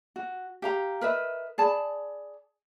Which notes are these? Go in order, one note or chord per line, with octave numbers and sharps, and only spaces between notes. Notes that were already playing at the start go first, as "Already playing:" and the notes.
F#4
G4 F5 A#5
A#4 B4 D#5 E5
G#4 D5 A5 B5